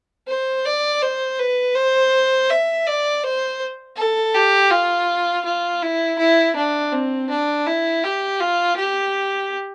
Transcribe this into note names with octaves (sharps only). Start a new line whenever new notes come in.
C5
D5
C5
B4
C5
E5
D5
C5
A4
G4
F4
F4
E4
E4
D4
C4
D4
E4
G4
F4
G4